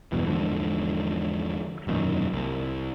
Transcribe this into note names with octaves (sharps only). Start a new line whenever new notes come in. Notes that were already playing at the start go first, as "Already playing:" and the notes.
E2 G2 B2 E3
E2 G#2 D3 F3
E1 F#2 A#2 D#3
C2